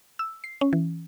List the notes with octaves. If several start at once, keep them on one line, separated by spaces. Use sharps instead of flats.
E6
C7
C#4
E3